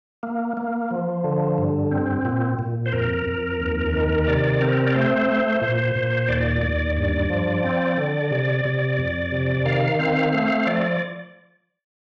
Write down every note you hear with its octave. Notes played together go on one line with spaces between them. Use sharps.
A#3
A#3
F3
D3
G2
C4
A#2
A#2
C5
F2 A#4
F2
D#2
D#3
C3 D5
C4 A#4
D5
A3 C5
A3
A#2
A#2
D#2 D5
D#2
G2 D5
F3
C4
D3
C3
C3
F2
C3
D#3 F5
C4 F5
A3 F5
F3 D5